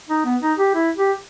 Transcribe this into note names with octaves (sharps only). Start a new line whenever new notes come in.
D#4
B3
D#4
G4
E4
G4